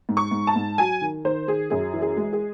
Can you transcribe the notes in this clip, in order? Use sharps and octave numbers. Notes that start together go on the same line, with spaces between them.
G#2
C#6
G#2
A5
G#2
F#3 G#5
D#3
D#3 C5
D#3 G#4
F#2 G#4
E3
G#4
G#3
G#4